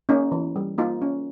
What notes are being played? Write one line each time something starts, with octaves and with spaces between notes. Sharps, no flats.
A#3 C#4 D#4
E3
G3
A#3 D#4 F4
C#4